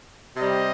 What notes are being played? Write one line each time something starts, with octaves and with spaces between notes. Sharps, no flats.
C3 G3 D#5